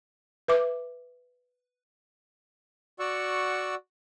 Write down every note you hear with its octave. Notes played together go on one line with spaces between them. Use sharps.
B4 E5 D6
F#4 D5 F#5 C#6 E6